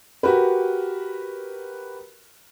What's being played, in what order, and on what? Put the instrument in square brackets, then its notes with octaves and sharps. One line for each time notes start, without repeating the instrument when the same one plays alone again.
[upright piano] F#4 G4 A#4 B4